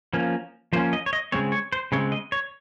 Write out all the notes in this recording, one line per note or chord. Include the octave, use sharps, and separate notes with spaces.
F3 A#3 C#4
F3 A#3 C#4 C5
D#5
C#5
D#5
C#3 G#3 C4 C#5
C#5
C5
C#3 G#3 C4 C#5
D#5
C#5